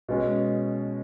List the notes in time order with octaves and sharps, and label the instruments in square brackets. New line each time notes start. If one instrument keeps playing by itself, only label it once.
[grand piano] B2 G#3 C#4